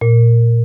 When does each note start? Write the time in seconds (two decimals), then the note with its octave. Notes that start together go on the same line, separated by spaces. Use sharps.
0.01 A#2